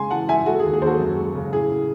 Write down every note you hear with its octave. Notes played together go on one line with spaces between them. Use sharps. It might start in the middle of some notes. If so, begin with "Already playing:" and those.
Already playing: C#3 G#3 G#5 C6
E3 F#5 A5
G#3 E5 G#5
G#3 F#4 A4
G#4
D#2
G#4
D#2 F#4 A4 C5
F#2
G#3
C#3
A2 G#4
A2